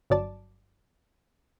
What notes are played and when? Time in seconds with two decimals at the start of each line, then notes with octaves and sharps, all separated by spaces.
0.10 G1 F#3 D5 A5